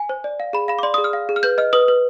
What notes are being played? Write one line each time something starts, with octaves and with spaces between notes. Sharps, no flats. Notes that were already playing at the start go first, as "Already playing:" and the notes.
Already playing: G#5
C5
D5
F5
G#4 B5
F5 B5
D6
D5 C6
D#6
G#4
F6
F5
G#4
F6
B4 G6
D#5 F6
B4 D#6
B4